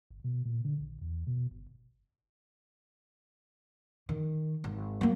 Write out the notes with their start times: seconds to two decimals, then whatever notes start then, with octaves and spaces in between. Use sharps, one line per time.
0.10 G1
0.24 B2
0.45 A#2
0.64 D3
0.80 A#1
1.01 E2
1.27 B2
1.51 G1
4.09 D#3
4.64 G#1
5.01 F#3 A#3